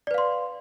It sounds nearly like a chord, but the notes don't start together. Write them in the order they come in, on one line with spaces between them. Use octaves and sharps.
D5 B4 F5 C6